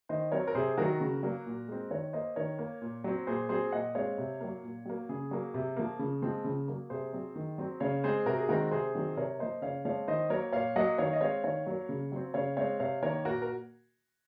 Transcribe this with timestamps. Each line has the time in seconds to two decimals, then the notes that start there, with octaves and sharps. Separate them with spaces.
0.09 D#3 C5 D#5
0.32 F#3 C4 A#4 C#5
0.47 A#4
0.55 C3 G#4 C5
0.77 D#3 F#3 F#4 A#4
1.00 C#3
1.23 F#3 A#3
1.46 A#2
1.68 G#3 C4
1.91 D#3 A#4 C#5
2.13 A#3 C5 D#5
2.36 D#3 A#4 C#5
2.59 A#3
2.82 A#2
3.04 F#3 C4
3.27 A#2 G#4 C5
3.49 F#3 C4 G#4 C5
3.72 A#2 D#5 F#5
3.95 G#3 C4 C#5 F5
4.18 C3
4.40 F#3 A#3
4.63 A#2
4.85 F#3 A#3
5.09 C#3 G#4
5.31 F#3 A#3
5.54 C3
5.76 F3 A#3
5.99 C#3
6.22 F3 G#3 C4
6.44 C#3
6.68 F#3 A#3
6.90 C3 G#4 C5
7.13 F#3 C4
7.35 D#3
7.58 F#3 C4
7.80 C#3 C#5 F5
8.04 G#3 C4 G#4 C5
8.26 C3 F#4 A#4
8.38 G#4
8.49 D#3 G#3 C4 F#4 A#4
8.71 C3 G#4 C5
8.95 D#3 F#3 C4
9.17 C3 A#4 C#5
9.39 F3 A#3 C5 D#5
9.62 C#3 C#5 F5
9.85 F3 G#3 C4 C#5 F5
10.08 D#3 C5 D#5
10.30 F#3 A#3 A#4 C#5
10.52 A#2 C#5 F5
10.76 F#3 A#3 D#5 F#5
10.98 D#3 C#5 F5
11.13 D#5
11.21 G#3 C4 C#5 F5
11.43 D#3 C#5 F5
11.66 F#3 A#3
11.89 C#3
12.12 F#3 C4
12.34 C#3 C#5 F5
12.57 G#3 C4 C#5 F5
12.80 C3 C#5 F5
13.02 D#3 A#3 A#4 C#5
13.25 A#2 F#4 A#4
13.42 A#4